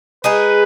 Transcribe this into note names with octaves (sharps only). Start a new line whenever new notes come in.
G#3 D#4 G#4 B4